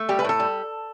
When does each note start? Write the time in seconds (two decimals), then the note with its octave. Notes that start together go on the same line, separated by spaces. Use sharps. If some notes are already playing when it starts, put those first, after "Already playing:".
Already playing: A3
0.09 G3 G4
0.19 B4
0.24 A2 A4
0.40 G3